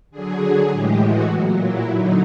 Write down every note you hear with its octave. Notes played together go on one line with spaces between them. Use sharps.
D3 F#3 G#4
A2 E3 G#3 G4
F#4
A#2 F#3
E4
D3 F#3 D#4